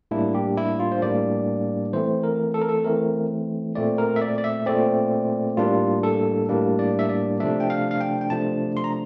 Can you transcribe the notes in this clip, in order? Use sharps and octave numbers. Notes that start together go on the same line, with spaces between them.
A2 G3 A#3 D4 E4
G4
E4
F4
C5
A2 G3 A#3 D4 D5
E3 A3 C4 C5
A#4
A4
A#4
A4
E3 A3 C4 A#4
A#2 A3 C4 D5
A#4
E5
D5
D5
E5
A#2 A3 C4 D5
A2 G3 A#3 D4 F4
A4
A2 G3 A#3 D4
D5
E5
D5
C3 F3 A3 D4 E5
G5
F5
F5
G5
G5
C3 F3 A3 D4 A5
C6
A#5